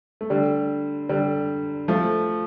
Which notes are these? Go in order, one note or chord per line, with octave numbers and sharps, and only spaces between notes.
A3
D3 G3
D3 G3
F3 A3